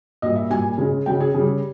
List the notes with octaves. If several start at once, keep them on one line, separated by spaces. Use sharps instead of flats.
A#2 G3 D#5
E5
A#2 G3 G#5
C#3 G#3
C#3 G#3 G5
G#4
C#3 G3